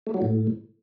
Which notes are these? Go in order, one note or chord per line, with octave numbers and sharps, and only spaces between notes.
A3
F#3
A2